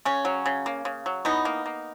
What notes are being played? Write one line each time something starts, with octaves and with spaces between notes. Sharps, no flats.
C#3 C#4
F#3
C#3
A#3
C#3
F#3
E3 B3 D#4
A#3
A#3